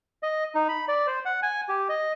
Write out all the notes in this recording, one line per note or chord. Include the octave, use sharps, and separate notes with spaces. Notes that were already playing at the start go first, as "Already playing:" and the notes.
D#5
D#4
B5
D5
C5
F#5
G#5
G4
D#5